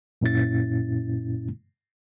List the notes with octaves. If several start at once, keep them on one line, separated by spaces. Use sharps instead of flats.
F#2 A#2 C#4 E4 A6